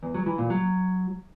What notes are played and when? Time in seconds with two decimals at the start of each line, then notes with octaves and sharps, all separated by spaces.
0.03 E2
0.15 F#3
0.26 E3
0.38 A#2
0.50 F#3